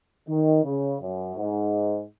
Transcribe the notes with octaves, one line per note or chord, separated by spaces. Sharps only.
D#3
C#3
F#2
G#2